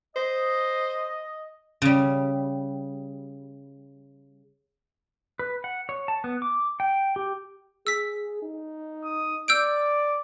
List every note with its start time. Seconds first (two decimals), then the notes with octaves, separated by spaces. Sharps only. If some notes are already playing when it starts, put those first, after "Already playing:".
0.16 C5 D#5
1.82 C#3 G3
5.39 B4
5.64 F#5
5.89 C#5
6.08 A5
6.24 B3
6.42 D6
6.80 G5
7.16 G4
7.87 G#4 E6 B6
8.43 D#4
9.04 D#6
9.48 D5 E6 G6 D7